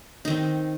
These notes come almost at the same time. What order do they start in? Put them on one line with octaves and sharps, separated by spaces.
D#4 D#3 C4